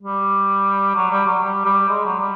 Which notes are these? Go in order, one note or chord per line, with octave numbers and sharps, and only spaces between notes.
G3
F#3
G3
F#3
G3
G3
G#3
F#3
G3